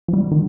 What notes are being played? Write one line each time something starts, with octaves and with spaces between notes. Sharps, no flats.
F3
G3
D#3